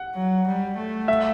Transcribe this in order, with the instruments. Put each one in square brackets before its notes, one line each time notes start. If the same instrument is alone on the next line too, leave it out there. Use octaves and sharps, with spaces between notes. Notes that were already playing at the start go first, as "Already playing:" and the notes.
Already playing: [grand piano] F#5
[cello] F#3
G3
A3
[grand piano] E5